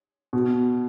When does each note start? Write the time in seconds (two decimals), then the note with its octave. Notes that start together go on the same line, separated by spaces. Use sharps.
0.33 B2